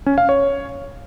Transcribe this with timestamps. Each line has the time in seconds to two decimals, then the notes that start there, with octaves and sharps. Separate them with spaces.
0.06 C#4
0.18 F5
0.29 C#5